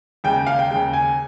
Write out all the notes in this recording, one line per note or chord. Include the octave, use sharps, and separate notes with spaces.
D#2 C#3 G#3 G5
F5
G5
D#2 C#3 G#3 G5
G#5